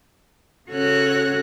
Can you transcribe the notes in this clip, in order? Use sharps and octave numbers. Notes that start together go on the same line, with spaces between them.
C#3 C#4 F#4 A4 C#5 F#6